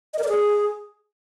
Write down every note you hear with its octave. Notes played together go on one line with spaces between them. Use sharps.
D#5
A#4
D5
G#4